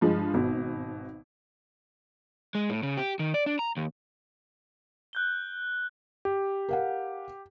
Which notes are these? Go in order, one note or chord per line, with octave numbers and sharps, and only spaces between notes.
G2 F3 G#3
G#1 B2
G#3
A2
C#3
G4
D#3
D5
D4
A#5
D#2
F#6 G6 G7
G4
A#4 F5 F#5